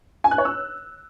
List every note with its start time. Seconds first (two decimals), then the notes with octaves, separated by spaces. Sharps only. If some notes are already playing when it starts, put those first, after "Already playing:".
0.24 G#5
0.31 F#6
0.38 C#5
0.45 E6